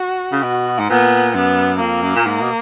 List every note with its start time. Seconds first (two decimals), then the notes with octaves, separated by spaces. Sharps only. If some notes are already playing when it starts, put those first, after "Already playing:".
Already playing: F#4
0.32 C#3
0.43 B2
0.79 G#2
0.90 A#2 B3
1.34 F#2 B3
1.80 F2 A#3
2.03 F#2
2.16 A#2
2.26 G#2
2.41 B2